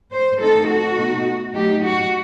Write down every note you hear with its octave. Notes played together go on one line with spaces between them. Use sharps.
C5
D#3 A3 C4 D#4 A4
F#4
B2 A3 D#4
F#3 A3 D#4 G4
F#4